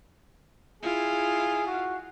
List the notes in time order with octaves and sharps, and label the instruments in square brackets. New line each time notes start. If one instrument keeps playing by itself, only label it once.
[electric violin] E4 F4 [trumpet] G#4
[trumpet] F#4